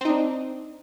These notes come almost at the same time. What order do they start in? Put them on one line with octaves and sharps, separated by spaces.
C4 D#4 D4